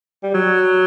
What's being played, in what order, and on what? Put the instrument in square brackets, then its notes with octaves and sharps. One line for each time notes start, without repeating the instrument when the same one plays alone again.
[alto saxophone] G3
F#3